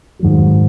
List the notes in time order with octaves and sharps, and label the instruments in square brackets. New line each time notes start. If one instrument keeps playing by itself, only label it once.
[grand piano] G#2 D#3 F#3